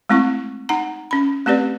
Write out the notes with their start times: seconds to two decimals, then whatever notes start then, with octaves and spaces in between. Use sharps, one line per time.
0.09 G#3 A3 C4 E4 C#6
0.69 D#4 F#5 A#5
1.11 C#4 B5
1.46 A3 C4 G4 B4 D5